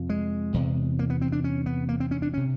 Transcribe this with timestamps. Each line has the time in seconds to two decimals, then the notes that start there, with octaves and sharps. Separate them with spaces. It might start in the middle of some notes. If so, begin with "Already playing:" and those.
Already playing: F2 C3
0.09 G#3
0.54 E2 C3
0.99 A#3
1.10 B3
1.22 C4
1.32 D4
1.44 C#4
1.66 B3
1.89 A#3
2.00 C4
2.11 C#4
2.22 D4
2.34 C3 C#4